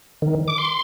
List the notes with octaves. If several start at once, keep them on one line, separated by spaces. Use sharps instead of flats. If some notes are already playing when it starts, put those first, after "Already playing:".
D#3
D6
C6